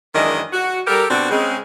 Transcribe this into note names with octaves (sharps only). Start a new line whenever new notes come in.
F#2 D#3 E3 G#3 D4 D#5
F#4
G3 G4 A4 A#4
B2 C4 D4 F#4
C#3 G#3 C4